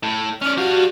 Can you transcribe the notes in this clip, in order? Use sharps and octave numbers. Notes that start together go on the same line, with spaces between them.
A2
C#4 D5 F6
G3 F#4 F5